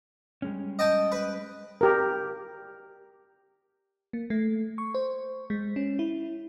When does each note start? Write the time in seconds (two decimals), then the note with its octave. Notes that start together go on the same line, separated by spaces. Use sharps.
0.42 G3 G#3 C#4
0.79 D#5 G5 A5
1.12 B4
1.81 G4 A#4
4.13 A#3
4.30 A3
4.78 C#6
4.95 C5
5.50 G#3
5.76 C#4
5.99 E4